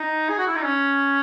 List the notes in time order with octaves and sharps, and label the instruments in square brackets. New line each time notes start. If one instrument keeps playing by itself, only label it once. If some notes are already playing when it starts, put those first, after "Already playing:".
Already playing: [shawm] D#4
G#4
F#4
E4
D#4
C#4